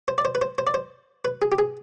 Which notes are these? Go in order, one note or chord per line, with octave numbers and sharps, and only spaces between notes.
C5
D5
C5
B4
C5
C5
D5
C5
B4
G#4
G4
G#4